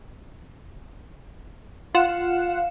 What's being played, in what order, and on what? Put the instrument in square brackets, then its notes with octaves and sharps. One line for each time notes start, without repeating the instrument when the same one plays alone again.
[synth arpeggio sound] F4 F#5 E7 [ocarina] F5